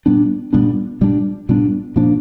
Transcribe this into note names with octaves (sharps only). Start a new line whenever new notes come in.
A#2 G3 B3 D4
A#2 G3 B3 D4
A#2 G3 B3 D4
A#2 G3 B3 D4
A#2 F3 A#3 D4